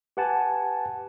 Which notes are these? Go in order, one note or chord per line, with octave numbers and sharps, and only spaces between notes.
G4 B4 F#5 G#5 A5